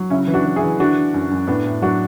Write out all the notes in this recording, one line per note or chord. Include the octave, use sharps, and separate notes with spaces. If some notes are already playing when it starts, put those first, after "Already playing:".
Already playing: F#3
C#3 C#4 E4
E3
D4 F#4
E3
E4 G#4
E3
D3 D4 F#4
D3
F#2
F#2
A2 B3 D4
A2
F#3 D4 F#4